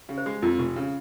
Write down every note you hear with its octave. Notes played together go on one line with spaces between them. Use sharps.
C#3
C5
G#3
F2 F4
F1
C#3